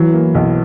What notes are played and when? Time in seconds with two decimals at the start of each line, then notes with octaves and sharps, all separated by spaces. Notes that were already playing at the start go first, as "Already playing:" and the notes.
Already playing: E3 F#3
0.13 A#3
0.35 B1